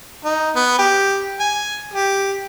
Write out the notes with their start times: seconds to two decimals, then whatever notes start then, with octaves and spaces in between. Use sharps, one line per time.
0.24 D#4
0.56 B3
0.79 G4
1.40 G#5
1.94 G4